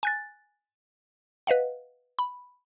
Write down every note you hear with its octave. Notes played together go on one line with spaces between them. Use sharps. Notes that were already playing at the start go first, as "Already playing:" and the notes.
G#5 F#6 A6
B4 D#5 F5 F#5
B5